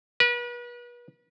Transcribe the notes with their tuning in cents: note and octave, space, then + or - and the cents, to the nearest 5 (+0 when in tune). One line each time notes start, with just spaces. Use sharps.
B4 -40